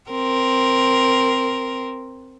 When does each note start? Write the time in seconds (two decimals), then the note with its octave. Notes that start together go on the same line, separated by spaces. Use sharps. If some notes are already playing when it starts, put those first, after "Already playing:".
0.11 C4 A#4